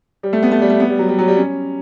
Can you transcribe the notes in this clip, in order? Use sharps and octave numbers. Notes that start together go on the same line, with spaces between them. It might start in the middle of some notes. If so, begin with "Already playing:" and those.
G3
A3
B3
A3
G3
A3
B3
G3
F#3
G3
F#3
G3
C#4